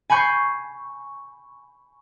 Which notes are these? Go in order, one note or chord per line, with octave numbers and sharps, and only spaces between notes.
G#5 B5 C#6 G6 C7